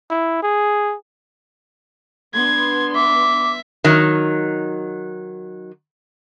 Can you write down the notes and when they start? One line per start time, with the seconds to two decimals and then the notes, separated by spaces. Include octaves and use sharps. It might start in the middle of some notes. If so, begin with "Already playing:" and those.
0.10 E4
0.43 G#4
2.34 B3 D4 C6 G#6
2.95 E5 D6
3.84 D#3 F#3